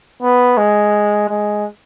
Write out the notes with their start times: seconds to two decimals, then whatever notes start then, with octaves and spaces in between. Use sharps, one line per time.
0.22 B3
0.58 G#3
1.29 G#3